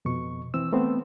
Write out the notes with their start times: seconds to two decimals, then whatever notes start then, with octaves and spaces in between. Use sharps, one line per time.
0.05 F2 B2 C#6
0.54 E3 C4 E6
0.72 A3 B3 C4